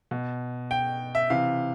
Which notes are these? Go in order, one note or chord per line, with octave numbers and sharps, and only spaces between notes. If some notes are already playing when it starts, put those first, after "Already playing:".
B2
G5
E5
C3 E3 F5